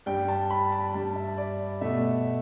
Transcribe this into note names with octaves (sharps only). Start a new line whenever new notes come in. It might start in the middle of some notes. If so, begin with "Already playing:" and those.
G2 G3 G5
A5
B5
A5
G2 G3 A5
E5
D5
B2 A3 E5